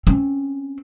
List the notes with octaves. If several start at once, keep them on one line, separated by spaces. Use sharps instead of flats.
C4 C#4